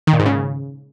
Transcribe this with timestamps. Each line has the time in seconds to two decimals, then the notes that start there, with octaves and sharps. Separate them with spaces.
0.07 D#3
0.13 A#2
0.20 G#2
0.26 C#3